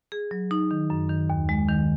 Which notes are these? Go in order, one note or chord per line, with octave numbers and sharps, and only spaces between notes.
G#4
F#3
D#4
D#3
F#2
D#3
D#2
G#3
D#3